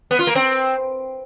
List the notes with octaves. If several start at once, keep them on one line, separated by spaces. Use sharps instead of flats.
B3
F4
A#3
C4